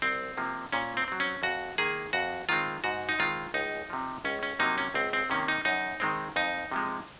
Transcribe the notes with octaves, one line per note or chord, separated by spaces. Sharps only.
C2 C4
C3 F3 A#3
A#2 C#4
C4
F#3 C4
C#4
F2 F#4
D#3 A#3 G#4
F2 F#4
D#3 G#3 C4 F4
G#2 F#4
D#4
D#3 G#3 C4 F4
C#2 D#4
C3 F3
C#2 C#4
C#4
C3 F#3 A#3 D#4
C#4
C#2 C4
C4
C3 D#3 A#3 C#4
D#4
F#2 D#4
D#3 G#3 C4
F2 D#4
C3 F3 G#3